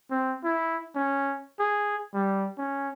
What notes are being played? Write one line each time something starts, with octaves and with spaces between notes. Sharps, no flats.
C4
E4
C#4
G#4
G3
C#4